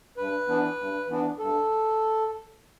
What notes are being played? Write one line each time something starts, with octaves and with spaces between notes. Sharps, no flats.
G2 B4
E3 B3 D4
G2
E3 B3 D4
G2 A4